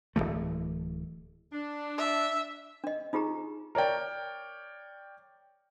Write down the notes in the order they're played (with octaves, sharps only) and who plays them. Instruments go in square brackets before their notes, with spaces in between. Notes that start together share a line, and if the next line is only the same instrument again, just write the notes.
[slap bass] D1 E2 E3 A3
[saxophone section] D4
[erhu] E5
[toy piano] D4 D#5
D#4 F4 G4 G#4 A#5
[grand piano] A#4 C#5 D5 G5